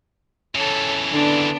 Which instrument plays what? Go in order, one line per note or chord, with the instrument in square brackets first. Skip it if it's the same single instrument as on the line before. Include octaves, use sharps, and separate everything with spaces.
[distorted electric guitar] C#3 E3 [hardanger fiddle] A4 C#5
[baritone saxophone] D3 [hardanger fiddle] B3 D4